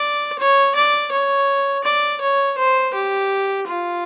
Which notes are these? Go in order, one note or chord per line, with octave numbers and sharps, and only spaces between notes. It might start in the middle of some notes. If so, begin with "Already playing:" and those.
Already playing: D5
C#5
D5
C#5
D5
C#5
C5
G4
F4